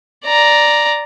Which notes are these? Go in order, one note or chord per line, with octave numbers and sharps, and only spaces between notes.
D5 A#5